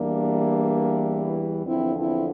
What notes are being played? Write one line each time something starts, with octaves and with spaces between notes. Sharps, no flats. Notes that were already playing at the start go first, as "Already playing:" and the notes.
Already playing: E2 E3 G3 A#3 D4
E2 D3 F3 C4 E4
C4 E4